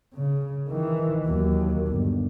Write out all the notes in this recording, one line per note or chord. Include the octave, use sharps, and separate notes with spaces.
C#3
D#3 E3
D#2 F#3
G1